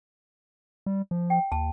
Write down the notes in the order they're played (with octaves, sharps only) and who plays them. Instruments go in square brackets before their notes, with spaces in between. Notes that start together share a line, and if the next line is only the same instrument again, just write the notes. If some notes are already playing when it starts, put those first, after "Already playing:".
[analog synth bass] G3
F3
[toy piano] G5
[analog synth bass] D#2 [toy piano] A5